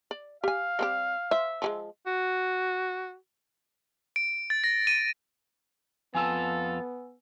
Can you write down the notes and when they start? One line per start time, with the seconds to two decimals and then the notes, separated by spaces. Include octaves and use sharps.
0.11 D5
0.44 G4 F5 G#5
0.79 G3 C4 G4
1.31 C5 E5
1.62 F3 G3 G#3
2.07 F#4
4.16 D7
4.50 A6
4.64 A#6
4.87 D#7
6.15 F2 B3 F4 A4 G#5 A5 E6